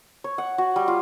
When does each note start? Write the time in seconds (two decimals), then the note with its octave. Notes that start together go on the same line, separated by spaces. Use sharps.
0.24 C#5
0.38 F#5
0.58 F#4
0.76 G3
0.88 F4